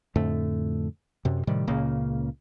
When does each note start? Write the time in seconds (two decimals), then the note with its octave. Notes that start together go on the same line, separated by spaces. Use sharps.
0.16 F2 A2 D3 A3
1.25 F#2 C3
1.47 A2 C3 D#3 G3
1.67 C#2 A#2 C#3 A#3